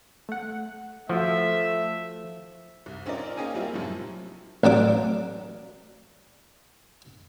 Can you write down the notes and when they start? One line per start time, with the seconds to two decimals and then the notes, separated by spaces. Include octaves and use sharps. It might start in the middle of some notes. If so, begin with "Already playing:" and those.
0.29 A3 F#5
1.09 F3 A3 F4 F#4 E5
2.86 C2
3.06 C4 C#4 D#4 F4 A#4 D5
3.37 A#3 C#4 G#4 D#5 G5 G#5
3.54 F#3 G3 A#3 C4 E4 F4
3.74 F#2 A2 C3 F3
4.64 A1 F#3 D4 D6